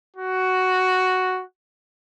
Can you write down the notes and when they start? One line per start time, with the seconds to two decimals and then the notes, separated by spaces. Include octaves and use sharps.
0.17 F#4